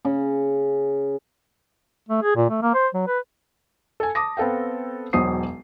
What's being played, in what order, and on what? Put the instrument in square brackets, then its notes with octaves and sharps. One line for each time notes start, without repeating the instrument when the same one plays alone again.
[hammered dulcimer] C#3
[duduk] A3
G#4
A#2
A3
A#3
C5
F#3
B4
[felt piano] A4 G#5
A5 D6 D#6 A#6
B3 C4 A4 F5 G5
E1 B1 F#3 C5 D#6 C7